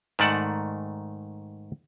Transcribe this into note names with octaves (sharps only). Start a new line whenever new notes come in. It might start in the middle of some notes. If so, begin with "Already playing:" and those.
G#2 D#3 A3 D5 F#5 A5